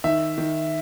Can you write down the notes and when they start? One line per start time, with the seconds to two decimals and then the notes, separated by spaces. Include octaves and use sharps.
0.04 D#3 E5
0.38 D#3